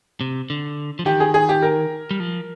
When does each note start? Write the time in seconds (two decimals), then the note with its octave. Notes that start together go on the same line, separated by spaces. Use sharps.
0.21 C3
0.50 D3
0.99 F3
1.05 D#3 G4
1.20 G#4
1.34 G#4
1.49 G4
1.62 A#4
2.11 G3
2.20 F3